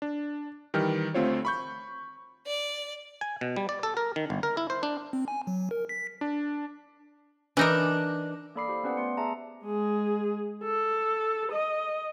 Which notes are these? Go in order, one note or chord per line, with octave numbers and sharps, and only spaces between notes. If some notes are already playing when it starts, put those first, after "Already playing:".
D4
D#3 E3 G3 G5 F6
D2 A3 C4 F4 C5 C#5
B5 C#6 G6
D5
G#5
B2
G3
D5
A4
A#4
D#3
G1
A#4
E4
C5
D4
C4
G#5
F#3
A#4
B6
D4
E3 D4 D#4 A#4
A#3 A4 D5 B5 D6 C7
E4 G4 C5
B3 C#4 G4 B4 D5 F#5
A3 B3 C6 C#7
G#4 E5 A5 A#5 C6
G#3 G#4
A4
D#5